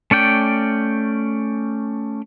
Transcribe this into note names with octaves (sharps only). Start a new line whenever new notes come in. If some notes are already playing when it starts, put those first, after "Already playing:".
A3 C#4 D5 G5